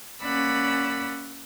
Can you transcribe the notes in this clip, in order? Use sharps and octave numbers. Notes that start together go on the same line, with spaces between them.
A#3 C#4 D5 F#5 B5 E6